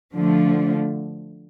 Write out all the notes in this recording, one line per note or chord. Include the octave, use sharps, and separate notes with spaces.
D3 F3 A3